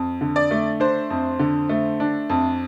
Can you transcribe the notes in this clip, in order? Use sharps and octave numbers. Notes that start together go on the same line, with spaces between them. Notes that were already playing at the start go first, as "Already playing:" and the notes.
Already playing: F2
D3
D5
A3
D4 C5
F2
D3
A3
D4
F2